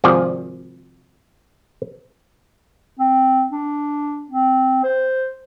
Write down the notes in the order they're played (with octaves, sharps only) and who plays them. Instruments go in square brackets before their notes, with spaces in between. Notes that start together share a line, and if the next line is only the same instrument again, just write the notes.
[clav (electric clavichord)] G#1 C3 F3 G#4 D5
[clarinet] C4
D4
C4
C5